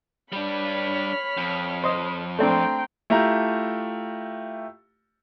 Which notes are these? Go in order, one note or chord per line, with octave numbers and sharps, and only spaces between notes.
G3 D4 C#5 B5 F6
F2
C5 D#5
A3 C4 D4 G5 A#5 C6
A3 E4 F4 G4 A#5